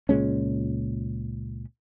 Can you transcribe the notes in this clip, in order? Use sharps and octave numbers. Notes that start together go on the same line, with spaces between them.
C#2 A#2 G#3 C#4